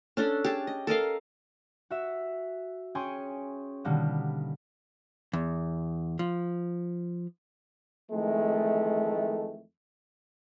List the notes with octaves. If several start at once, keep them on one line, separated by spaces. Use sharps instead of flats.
C#4 D4 A4
G4 G#4 A5
D#5
A4 A#4 D#5 F5
F#4 E5
C#4 G#4 G5 C6 C#6
B2 D3 D#3 G3 A#3 B3
E2
F3
F2 D#3 E3 G#3 A3